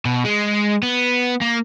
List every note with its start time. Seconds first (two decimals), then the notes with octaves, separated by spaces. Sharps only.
0.05 B2
0.25 G#3
0.83 B3
1.41 A#3